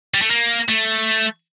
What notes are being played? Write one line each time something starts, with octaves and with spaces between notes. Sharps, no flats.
G3
A3
A#3
A3